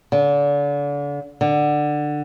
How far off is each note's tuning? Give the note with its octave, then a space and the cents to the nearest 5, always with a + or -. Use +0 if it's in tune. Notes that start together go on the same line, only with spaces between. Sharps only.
D3 -35
D3 +15